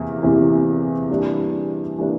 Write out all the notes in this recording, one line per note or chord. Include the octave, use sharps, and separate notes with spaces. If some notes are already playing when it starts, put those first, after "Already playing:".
Already playing: E2 C3 E3 A#3
E2 C3 E3 A#3
E3 G3 A#3 D4
E3 G3 A#3 D4